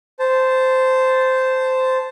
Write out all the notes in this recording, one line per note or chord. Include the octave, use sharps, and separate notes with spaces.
C5 A5